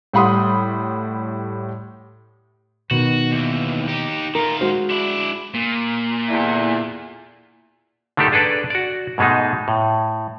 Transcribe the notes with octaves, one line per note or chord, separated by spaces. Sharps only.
A2 G3 F#5 B5 C6 D#6
B2 D#3 F#4
D#2 E3
D#4 G4
D#3 F4 A#4
G#3 F#4 C5
D4 E4
A#2
E2 D3 E4
D3 D#3 A3 D4 G4 A4
D4 G#4 A4 B4 D5
F#4 D5
G#2 B2 G#3 A3 D#4
A2